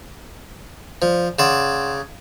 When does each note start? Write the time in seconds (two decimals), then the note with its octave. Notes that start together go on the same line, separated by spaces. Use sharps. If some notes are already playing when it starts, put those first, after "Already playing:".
1.02 F3 C5 D5
1.39 C#3 D5 F#5 C6 E7